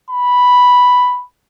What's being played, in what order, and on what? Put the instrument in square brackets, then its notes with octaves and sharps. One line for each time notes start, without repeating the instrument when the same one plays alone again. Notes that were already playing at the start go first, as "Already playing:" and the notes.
[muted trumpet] B5